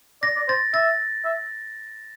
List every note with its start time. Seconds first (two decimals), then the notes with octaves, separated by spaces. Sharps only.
0.22 D5 A#6
0.36 D5
0.48 C5 A6
0.74 E5 A6
1.25 E5